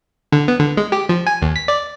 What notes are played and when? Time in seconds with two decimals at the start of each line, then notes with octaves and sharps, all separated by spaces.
0.32 D3
0.48 B3
0.60 D3
0.77 G#3
0.92 G4
1.09 F3
1.27 G#5
1.42 D#2
1.56 B6
1.68 D5